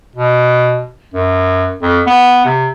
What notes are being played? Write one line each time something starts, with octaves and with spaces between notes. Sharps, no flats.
B2
F#2
F2
B3
C3